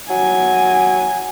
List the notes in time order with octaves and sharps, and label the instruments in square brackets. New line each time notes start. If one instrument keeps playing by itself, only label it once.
[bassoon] F#3 [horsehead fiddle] G#5